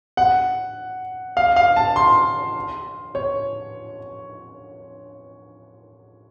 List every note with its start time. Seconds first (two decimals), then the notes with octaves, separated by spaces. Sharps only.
0.17 F#5
1.37 F5
1.56 F5
1.76 A5
1.96 C6
3.15 C#5